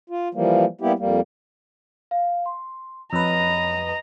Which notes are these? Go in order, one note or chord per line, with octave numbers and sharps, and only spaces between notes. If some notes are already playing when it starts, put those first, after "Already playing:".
F4
E3 F3 G3 A#3
G3 A#3 B3 E4 G4
F2 G3 A#3
F5
C6
F2 B4 C#5 D#5 A#5 B5